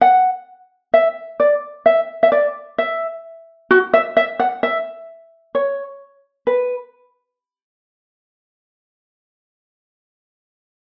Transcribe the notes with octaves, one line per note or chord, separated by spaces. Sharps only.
F#5
E5
D5
E5
E5
D5
E5
F#4
E5
E5
F#5
E5
C#5
B4